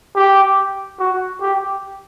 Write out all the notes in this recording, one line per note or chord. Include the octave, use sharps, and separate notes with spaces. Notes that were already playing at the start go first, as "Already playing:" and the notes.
G4
F#4
G4